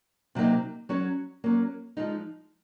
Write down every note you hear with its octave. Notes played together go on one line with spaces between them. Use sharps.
C3 F#3 A#3 D#4
F#3 C#4 F#4 C#5
F#3 A#3 C#4
F3 G#3 D#4